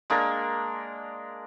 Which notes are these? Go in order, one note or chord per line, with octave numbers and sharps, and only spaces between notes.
G#3 A#3 D4 A#4